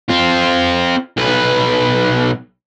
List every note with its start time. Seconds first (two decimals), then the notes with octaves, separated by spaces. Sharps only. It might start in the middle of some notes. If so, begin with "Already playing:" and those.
0.09 C4 F4
1.17 B1 B4